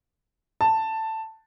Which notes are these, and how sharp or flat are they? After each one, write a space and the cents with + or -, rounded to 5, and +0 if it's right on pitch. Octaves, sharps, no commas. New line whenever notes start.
A5 +10